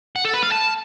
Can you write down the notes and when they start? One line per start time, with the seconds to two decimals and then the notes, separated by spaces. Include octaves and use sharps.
0.16 F#5
0.25 A4
0.33 B4
0.42 F5
0.51 A5